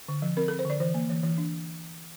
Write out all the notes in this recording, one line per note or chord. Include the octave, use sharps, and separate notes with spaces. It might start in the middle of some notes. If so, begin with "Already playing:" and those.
D3
F3
C4 A#4
C4 A4
C5
D3 D5
E3 C5
A#3
E3
E3
D4